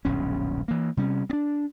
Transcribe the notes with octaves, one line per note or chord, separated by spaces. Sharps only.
D#1 B1 G2 C#4
E3 A#3
C3 G3 C#4
C4 D4